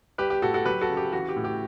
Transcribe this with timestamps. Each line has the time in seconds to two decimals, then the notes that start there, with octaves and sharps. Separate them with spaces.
0.18 G3 G4 B4
0.30 G4
0.42 A2 F#4 A4
0.54 F#4 A4
0.66 F#3 G4 B4
0.81 F#4 A4
0.89 C#3
0.97 G4
1.12 E3 F#4
1.29 G4
1.36 A2
1.44 G4